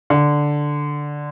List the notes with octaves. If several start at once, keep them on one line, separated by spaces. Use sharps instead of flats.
D3